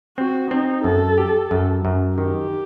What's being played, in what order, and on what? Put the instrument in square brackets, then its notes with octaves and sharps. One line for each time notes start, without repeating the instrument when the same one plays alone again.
[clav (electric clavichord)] C4 [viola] F#4
[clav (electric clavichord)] C4 [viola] D#4
[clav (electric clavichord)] F#2 [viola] A4
[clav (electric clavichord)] G4
F#2
F#2
[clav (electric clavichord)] D#3 [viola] G4